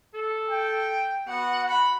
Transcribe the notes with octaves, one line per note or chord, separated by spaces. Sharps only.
A4
G5
B3 F#4 F#5
F#5 B5